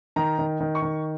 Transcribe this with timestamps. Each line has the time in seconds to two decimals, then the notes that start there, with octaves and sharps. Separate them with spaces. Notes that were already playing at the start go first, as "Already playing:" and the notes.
0.16 D#3 A#5
0.39 D#3
0.60 D#3
0.75 C#6
0.82 D#3